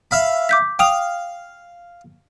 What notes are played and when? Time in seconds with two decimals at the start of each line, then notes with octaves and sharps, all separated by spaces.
0.11 E5 F5 B5
0.49 D6 G6 B6
0.79 F5 G5 D#6 F7